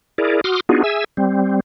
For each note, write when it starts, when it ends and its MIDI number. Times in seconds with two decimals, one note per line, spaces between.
0.18 0.41 64
0.18 0.41 68
0.18 0.41 70
0.18 0.41 74
0.44 0.60 66
0.44 0.60 84
0.44 0.60 86
0.44 0.60 87
0.44 0.60 89
0.69 0.83 59
0.69 0.83 62
0.69 0.83 63
0.69 0.83 65
0.69 0.83 66
0.69 0.83 68
0.84 1.04 68
0.84 1.04 76
0.84 1.04 80
0.84 1.04 88
1.17 1.60 55
1.17 1.60 60